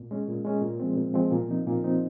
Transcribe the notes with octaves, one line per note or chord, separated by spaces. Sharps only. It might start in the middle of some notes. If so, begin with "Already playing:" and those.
Already playing: A#2
G#3 C#4
A#2
G#3 C#4
A#2
F3 G#3 C4
A#2
F3 G#3 C4
A#2
F3 C4 D#4
A#2
F3 C4 D#4